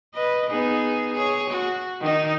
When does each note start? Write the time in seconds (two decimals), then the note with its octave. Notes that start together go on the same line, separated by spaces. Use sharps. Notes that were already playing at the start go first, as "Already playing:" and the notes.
0.14 B4 D#5
0.50 B3 D#4 G#4
1.14 G#4 C#5
1.50 F#4
2.01 D#3 D#4